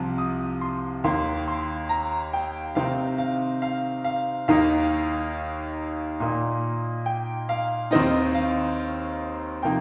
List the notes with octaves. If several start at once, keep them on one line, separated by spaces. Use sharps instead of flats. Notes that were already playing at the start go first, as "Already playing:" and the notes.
Already playing: C2 C3 F3
D#6
C6
D#2 D#3 A#3 D#4 C6
C6
A#5
G5
C3 D#3 C4 D#4 F5
F5
F5
F5
D#2 D#3 A#3 D#4 F5
A#2 A#3 D#4
G5
F5
D#2 D#3 C4 D#4 D#5
F5
C3 F3 A#3 D#4 G5